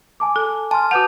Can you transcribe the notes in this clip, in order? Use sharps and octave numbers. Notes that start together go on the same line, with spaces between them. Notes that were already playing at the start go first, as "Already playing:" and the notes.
G#5 A5 D6
A4
G#5 A5 C6 F6
F#4 B4 F#5 D6 G6 F7